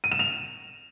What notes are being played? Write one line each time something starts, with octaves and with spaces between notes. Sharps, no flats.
D#7
E7
F7